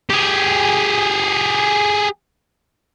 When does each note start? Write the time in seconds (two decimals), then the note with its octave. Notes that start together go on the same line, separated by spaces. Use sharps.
0.10 G4 G#4